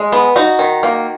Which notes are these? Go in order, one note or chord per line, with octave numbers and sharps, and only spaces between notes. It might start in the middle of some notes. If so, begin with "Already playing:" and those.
Already playing: G#3
B3
D#4 F#4
D#3
A#3